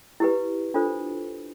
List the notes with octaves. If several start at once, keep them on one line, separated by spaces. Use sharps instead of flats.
E4 G4 B4
D4 F4 A4 C5